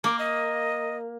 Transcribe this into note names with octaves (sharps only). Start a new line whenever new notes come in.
A#3 D6
D#5